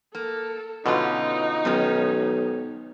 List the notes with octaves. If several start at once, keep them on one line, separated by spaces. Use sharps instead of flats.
A#3 A4
F#2 B2 D3 C#4 D#4 F4
B1 G#2 D#3 C#4